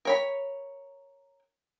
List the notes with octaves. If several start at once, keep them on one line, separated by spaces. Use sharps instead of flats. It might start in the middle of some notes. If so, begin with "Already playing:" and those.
A#4 C#5 B5